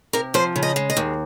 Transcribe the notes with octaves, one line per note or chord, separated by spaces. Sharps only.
C3 A#4
F3 C5
C#3
D#5
G#3
D#5
D#2